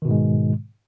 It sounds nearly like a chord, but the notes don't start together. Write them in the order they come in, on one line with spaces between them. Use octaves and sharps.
D#3 B2 G#2 G#3